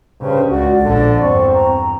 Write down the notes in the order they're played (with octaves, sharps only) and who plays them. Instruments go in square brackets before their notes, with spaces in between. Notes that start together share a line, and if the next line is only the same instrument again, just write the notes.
[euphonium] G2 [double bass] C#3 [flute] C5
[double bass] C#2 [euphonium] F#4 [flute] D5
[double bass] A#1 [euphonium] D3
[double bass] E2 G2 [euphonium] C4 [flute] C#6
[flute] A#5